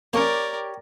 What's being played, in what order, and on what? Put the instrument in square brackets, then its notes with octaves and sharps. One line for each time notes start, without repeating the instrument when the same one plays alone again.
[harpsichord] A#3 C#4 [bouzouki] G4 C#5 [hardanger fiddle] A#4 D5